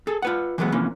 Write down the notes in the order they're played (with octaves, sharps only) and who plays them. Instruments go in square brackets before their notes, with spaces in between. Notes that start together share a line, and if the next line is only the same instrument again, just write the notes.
[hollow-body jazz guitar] G#4 A4
F4 B4 F#5
E3 F#3 G#3 A3 B3
C3 E3 F3 A#3 C#4